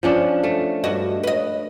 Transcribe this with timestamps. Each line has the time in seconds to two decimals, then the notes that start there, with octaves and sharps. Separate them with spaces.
0.03 F3 C#4 D4
0.43 A3
0.84 G2 F#4 D#5
1.23 B4 D#5